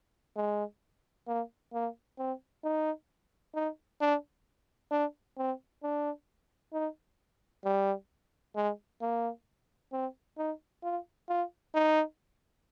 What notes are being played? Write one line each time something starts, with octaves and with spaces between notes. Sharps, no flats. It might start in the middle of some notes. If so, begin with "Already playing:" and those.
G#3
A#3
A#3
C4
D#4
D#4
D4
D4
C4
D4
D#4
G3
G#3
A#3
C4
D#4
F4
F4
D#4